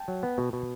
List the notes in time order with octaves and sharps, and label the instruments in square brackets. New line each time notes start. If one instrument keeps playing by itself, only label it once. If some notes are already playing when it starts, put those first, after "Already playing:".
Already playing: [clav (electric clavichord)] G5 A5
F#3
B3
B2
B2